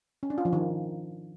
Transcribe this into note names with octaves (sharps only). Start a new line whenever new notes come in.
C#4
D4
F4
F3
D#3